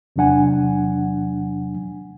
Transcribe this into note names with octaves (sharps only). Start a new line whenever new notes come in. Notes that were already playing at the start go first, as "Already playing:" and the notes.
E2 C3 F#3 D4 F#5 G#5